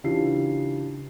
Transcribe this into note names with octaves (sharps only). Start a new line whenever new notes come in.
C#3 E3 D4 F4 G4 C7